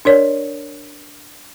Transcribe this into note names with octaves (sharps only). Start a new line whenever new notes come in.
D4 A#4 C#5 D5